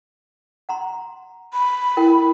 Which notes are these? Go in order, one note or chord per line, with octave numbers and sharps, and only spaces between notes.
F#5 A#5 C6
B5
E4 A#4 G5